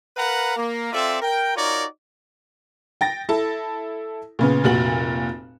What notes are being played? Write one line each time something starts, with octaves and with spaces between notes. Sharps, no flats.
A#4 B4 F5 F#5 A#5 B5
A#3
C4 F4 A4 D5 E5
A#4 G5
D#4 F4 F#4 A#4 C#5 D5
G5 A6 A#6
E4 A4 A5
A#2 C#3 B3
F1 A#2 F#4 F#7